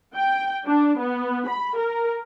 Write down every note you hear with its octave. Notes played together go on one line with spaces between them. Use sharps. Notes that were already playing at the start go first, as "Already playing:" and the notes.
G5
D4
B3
B5
A#4